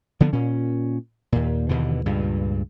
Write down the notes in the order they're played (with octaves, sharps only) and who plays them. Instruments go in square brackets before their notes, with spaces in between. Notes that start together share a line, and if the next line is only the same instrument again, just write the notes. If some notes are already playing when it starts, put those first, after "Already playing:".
[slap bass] D3 F3 B3
A#2 C#4
D#2 A#2
D#2 B2 D3 E3
C#2 G2 A#2